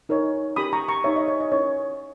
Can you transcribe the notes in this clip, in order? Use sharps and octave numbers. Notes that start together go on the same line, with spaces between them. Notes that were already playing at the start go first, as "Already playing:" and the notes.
D#4 A#4 C#5
C#4 G4 A#4 B5 D#6
A#5 C#6
A#5 C#6
D#4 G4 C#5 E5
D#5
C#5
D#5
C#4 E4 A#4 C#5